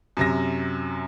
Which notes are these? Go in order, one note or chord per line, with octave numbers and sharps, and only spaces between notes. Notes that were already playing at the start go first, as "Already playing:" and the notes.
F#2 C3 A#6